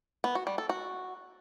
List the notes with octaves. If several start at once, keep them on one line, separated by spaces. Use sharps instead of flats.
B3
F#4
G3
A4
F#4